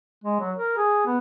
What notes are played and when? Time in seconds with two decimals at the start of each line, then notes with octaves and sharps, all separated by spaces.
0.24 G#3
0.40 F#3
0.56 A#4
0.77 G#4
1.06 B3